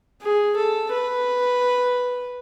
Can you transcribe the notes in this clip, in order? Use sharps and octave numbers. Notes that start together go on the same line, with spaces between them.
G#4
A4
B4